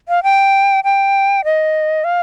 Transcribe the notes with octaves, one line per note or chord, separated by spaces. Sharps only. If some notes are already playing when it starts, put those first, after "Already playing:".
F5
G5
G5
D#5
F5